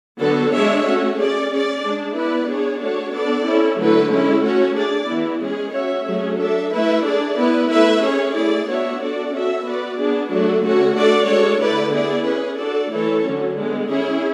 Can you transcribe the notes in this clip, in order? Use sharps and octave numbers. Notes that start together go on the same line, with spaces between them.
D3 F#3 B3 F#4 A4
G#3 D4 G#4 C#5 E5
A3 C#4 F#4
C#4 G#4 D5
C#4 G#4 D5
G#3 D4 G#4
B3 E4 B4 D5
D4 G#4 C#5
A3 D4 F#4 C#5
B3 D4 A4 D5
C#4 E4 A4
D3 F#3 A3 E4 B4
G#3 C#4 E4 A4
A3 C#4 F#4
D4 G#4 D5
E3 B3 E4
G#3 C#4 G#4
C#4 F#4 C#5 E5
F#3 A3 C#4 G#4
D4 A4 E5
A3 E4 B4 E5
D4 G#4 D5
B3 E4 B4
A3 E4 B4 E5
C#4 G#4 C#5
A3 E4 G#4 D5
B3 D4 F#4 C#5 E5
D4 F#4 A4 D5
C#4 F#4 A4 E5
B3 F#4 B4 D5
B3 D4 G#4
F#3 A3 D4 F#4
D3 A3 C#4 F#4
A3 D4 F#4 A4 D5
G#3 D4 F#4 A4 C#5
D3 A3 E4 B4 D5
B3 E4 G#4 D5
C#4 G#4 B4
D4 F#4 A4 D5
E3 A3 E4 A4 C#5
D3 F#3 C#4
D3 G#3 B3
C#4 E4 G#4